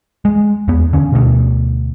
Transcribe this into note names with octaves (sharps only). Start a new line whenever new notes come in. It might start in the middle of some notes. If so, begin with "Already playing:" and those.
G#3
E2 B3
D3 C#4
D2 B2